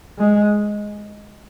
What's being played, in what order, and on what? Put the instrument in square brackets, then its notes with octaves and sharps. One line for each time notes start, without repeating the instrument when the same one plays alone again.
[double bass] G#3